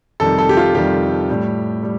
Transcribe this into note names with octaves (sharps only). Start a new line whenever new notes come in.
F2 C3 D#3 G3 A4
A4
G4
F4
F2 C3 D#3 G3 G4
A2 G3
G3